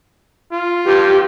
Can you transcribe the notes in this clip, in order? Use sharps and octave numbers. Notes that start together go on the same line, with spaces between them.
F4
G2 G4